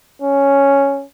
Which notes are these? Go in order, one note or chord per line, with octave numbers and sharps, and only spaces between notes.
C#4